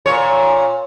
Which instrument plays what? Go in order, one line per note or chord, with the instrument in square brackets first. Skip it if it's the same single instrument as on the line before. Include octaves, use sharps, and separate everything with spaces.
[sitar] A#2 C#5